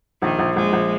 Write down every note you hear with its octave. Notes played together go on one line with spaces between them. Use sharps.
A#1 D#3
A#1
A#1 G#3
A#1